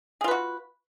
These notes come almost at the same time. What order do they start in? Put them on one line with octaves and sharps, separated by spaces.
G#4 F4 B4 F#4